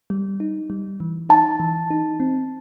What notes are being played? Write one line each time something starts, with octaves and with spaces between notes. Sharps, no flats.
G3
D#4
G3
E3
D#4 A5
E3
D#4
C4